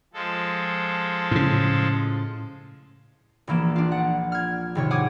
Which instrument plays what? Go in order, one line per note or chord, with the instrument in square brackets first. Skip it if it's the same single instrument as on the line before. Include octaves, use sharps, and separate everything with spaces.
[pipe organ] F3 G#3 A4
[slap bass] A2 C#3
[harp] A#1 E3 A#3 E7
D4 F4
F#5
F6 G#6
G#1 C3 C#5
F#5 G#5 D6 D#6 G#6